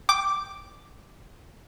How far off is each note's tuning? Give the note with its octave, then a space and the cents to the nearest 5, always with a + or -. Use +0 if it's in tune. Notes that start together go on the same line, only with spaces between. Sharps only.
G5 +0 D6 +0